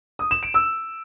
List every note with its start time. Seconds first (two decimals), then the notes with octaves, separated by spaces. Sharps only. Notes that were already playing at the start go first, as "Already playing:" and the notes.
0.19 D#6
0.31 E7
0.43 D7
0.54 E6